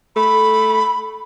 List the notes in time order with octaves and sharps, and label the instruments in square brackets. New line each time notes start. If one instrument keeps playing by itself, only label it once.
[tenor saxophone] A3 [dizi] B5